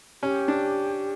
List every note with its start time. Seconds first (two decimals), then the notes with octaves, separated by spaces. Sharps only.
0.23 C#4 G4
0.48 D4